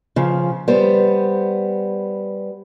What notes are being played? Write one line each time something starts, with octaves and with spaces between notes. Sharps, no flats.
C#3 F3
G3 B3 C5